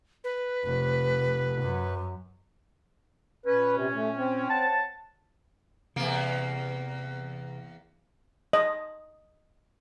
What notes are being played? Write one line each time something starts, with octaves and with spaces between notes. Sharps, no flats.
B4
F1
F#2
A#2 C#4 B4
C3
A3
C4
C#5 F#5 A5
E2 C3 A#3
D#5